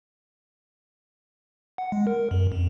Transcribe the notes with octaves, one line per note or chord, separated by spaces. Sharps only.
F#5
G#3
A#4
F#2
F2